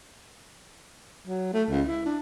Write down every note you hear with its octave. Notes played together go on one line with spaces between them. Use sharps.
F#3
A3
C#2
E4
D4